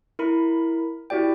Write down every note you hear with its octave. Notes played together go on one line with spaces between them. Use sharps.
E4 A#4 B5
E4 F#4 G4 D5 G5